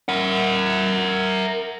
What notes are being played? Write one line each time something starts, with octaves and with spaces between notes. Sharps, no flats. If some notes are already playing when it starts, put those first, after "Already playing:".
A#4 F#5